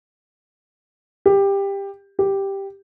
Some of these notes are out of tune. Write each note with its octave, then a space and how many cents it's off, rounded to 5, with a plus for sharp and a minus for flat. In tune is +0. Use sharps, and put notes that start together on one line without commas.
G4 +15
G4 +0